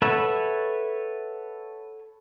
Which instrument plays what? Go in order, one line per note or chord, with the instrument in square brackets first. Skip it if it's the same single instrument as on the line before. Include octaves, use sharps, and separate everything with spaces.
[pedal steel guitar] A4 B4 C#5 E5 F#5